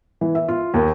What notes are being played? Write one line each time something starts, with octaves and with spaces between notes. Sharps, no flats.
E3
E5
F4
D#2